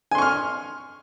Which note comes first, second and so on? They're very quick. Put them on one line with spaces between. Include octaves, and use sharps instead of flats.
G#5 C6 C#6 F6